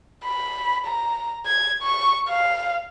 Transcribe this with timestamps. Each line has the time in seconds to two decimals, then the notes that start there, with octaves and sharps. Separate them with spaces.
0.25 B5
0.86 A#5
1.46 G#6
1.83 C#6
2.29 F5